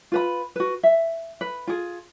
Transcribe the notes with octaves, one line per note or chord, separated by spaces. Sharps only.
F4 B4 B5
F#4 B4
E5
B4
F4 G#4